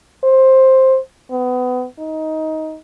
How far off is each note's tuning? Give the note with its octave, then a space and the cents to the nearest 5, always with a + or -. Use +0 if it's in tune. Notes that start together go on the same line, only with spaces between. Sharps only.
C5 +10
B3 +25
D#4 +15